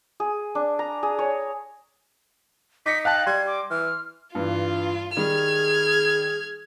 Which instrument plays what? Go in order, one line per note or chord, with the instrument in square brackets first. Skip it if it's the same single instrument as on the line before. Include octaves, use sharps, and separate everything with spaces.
[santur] G#4
D4
A#5
G#4
C#5
[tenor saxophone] D#4 [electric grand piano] D6 A#6 C#7 [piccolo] B6
[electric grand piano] F5 G5 A5 [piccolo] F#6
[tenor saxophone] G3 [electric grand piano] C6 [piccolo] G#6
[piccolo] D6
[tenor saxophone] E3 [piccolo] F6
[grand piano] G2 E3 [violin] F4
[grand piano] D#3 G3 [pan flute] G#4 [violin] F6 G#6